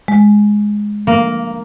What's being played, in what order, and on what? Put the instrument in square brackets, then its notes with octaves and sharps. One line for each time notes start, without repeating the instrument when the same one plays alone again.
[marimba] G#3
[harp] A#3